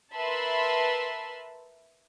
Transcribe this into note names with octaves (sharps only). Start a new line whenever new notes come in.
A#4 B4 E5 A5 B5 C6